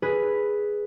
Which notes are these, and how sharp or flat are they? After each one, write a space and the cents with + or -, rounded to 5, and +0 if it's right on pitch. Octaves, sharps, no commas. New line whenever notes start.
G#4 +0 B4 +0